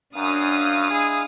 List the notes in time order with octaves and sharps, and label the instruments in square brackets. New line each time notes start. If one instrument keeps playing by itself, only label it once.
[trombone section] F#2 [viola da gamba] D4 [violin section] F5 D#6
[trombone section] G#3 E4 G#4